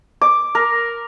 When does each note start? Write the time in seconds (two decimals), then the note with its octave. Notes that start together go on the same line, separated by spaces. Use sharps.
0.22 D6
0.55 A#4